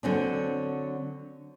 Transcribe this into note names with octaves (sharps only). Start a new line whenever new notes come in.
D3 F#3 C4 D4